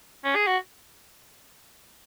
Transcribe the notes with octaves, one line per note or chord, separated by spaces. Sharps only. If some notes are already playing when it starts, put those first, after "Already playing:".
C#4
G#4
F#4